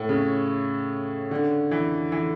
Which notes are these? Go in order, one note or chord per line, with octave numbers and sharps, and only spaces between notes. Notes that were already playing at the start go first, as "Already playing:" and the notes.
Already playing: A2
C#3
D3
E3
E3